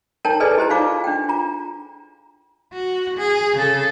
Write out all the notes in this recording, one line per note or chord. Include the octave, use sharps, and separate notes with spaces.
D#4 A#4 C#5 G5 A5 A#5
G#4 A4 B4 D5 D#5 G#5
E4 G4 C5 A#5
D#4 F4 F5 D6
D4 G5
F4 A#5
F#4
G#4
C#3 A4